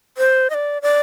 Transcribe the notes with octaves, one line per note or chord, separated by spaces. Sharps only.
C5
D#5
D5
D5